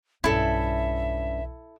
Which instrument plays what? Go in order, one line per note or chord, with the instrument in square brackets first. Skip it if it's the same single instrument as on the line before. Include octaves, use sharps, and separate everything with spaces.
[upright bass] B1 E2 [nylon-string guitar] G2 C#4 [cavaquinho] E4 A4 [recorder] E5